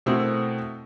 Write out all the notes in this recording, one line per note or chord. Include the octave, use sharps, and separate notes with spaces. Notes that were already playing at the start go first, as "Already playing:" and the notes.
B2 A3 C4 E4 F#4 A#4